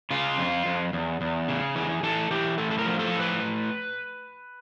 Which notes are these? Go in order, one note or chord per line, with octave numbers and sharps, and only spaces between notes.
C#3 F4
F2
F2
E2
E2
C#3
E3 G#4
E3 A4
E3 G4
A2 A4
A4
A#4
F3
A4
A2
B4